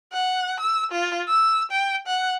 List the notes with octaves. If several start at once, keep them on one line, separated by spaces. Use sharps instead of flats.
F#5
E6
F4
E6
G5
F#5